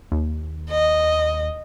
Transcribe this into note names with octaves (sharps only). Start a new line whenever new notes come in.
D#2
D#5